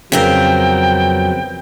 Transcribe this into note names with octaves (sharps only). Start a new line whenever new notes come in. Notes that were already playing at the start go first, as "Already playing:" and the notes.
F2 C#3 F#3 B3 C4 A#4 G5